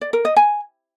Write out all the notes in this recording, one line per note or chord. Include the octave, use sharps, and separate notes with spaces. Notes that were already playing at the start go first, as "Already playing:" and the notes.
D5
A#4
D#5
G#5